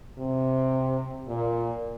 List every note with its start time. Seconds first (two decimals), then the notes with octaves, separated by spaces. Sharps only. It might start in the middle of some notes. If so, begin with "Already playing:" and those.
0.18 C3
1.28 A#2